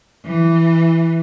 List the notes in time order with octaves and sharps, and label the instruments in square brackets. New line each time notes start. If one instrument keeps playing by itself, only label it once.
[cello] E3